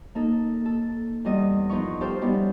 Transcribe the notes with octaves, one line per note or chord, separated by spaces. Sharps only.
A#3 D#4 A4
A4
E2 G3 D#5
F3 B3 D#4 A#4 C#6
G4 A4 C5 F5
G3 B3 C#4 D#4 E4 G4